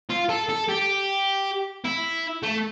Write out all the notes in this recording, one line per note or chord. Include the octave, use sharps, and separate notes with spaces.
F4
A4
A4
G4
E4
A3